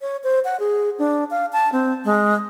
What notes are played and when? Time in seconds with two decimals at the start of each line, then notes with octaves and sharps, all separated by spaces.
0.01 C#5
0.24 C5
0.45 F#5
0.60 G#4
0.99 D4
1.31 F5
1.53 A5
1.72 C4
2.05 G#3